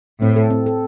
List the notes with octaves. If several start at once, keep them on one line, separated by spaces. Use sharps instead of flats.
A2 C4
A4
C4
A4